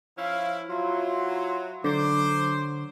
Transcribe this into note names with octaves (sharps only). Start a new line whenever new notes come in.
F3 C#4 E4 F5
F#3 E4 F4 C5 C6
D3 F#3 C5 D6